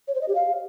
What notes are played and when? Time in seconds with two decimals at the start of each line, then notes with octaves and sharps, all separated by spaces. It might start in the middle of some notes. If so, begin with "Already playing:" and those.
0.08 C#5
0.14 C5
0.21 D#5
0.28 G4
0.35 F5